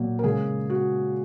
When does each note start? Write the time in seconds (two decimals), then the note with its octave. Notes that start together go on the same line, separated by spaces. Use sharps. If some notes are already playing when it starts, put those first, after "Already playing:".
Already playing: A#2 F#3 A#3
0.19 A#4
0.24 C#3 G#3 G#4
0.70 F#4